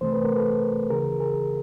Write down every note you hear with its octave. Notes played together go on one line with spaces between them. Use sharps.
C2 C3 E3 A3 C5
B4
A#4
A4 B4
D#2 C#3 E3 G#4 A#4
G#4 A#4